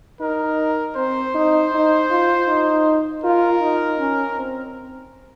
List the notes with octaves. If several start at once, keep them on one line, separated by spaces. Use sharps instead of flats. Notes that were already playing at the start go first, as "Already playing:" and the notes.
D#4 A#4
C4 C5
D#4
D#4
F4
D#4
F4 A#4
D#4
C#4
C4